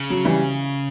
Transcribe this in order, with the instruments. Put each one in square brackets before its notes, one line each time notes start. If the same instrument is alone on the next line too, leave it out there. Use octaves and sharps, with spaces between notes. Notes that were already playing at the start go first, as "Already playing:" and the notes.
Already playing: [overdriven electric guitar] C#3
[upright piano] F#3
E3 G3